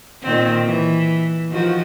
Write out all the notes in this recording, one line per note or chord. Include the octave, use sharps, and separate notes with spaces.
A#2 D#3 C4
E3
D#3 F3 F#4